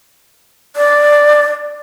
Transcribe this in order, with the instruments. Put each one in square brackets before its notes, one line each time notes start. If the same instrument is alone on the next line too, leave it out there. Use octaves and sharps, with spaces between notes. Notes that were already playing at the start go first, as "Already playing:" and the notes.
[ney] D5